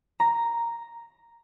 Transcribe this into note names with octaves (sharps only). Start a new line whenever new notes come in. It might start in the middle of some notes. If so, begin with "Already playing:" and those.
A#5